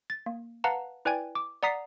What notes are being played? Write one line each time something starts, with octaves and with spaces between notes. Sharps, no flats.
A6
A#3
B4 F5 F#5 A5 A#5
E4 B4 D5 G5 G#5 G#6
D6
D5 F#5 A#5 D#6 B6 C7